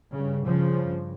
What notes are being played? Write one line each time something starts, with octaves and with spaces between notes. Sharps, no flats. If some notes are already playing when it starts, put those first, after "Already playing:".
G2 C#3
C#3 F3
G2